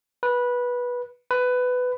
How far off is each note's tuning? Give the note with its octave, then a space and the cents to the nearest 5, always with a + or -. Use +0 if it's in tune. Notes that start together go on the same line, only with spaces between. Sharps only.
B4 -15
B4 +15